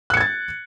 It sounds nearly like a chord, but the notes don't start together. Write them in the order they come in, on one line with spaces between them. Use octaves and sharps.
F#6 C#7 G#6 A6